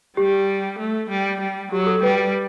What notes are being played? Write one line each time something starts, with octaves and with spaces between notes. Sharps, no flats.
G3 G4
A3
G3
G3
F#3 G4
A4
G3 B4